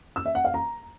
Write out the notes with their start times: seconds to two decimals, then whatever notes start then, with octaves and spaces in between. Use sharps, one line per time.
0.16 E6
0.26 E5
0.35 F#5
0.45 F5
0.54 A#5